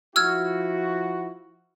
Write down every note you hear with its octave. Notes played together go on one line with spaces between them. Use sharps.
F3 E4 F#4 E6 F6 G#6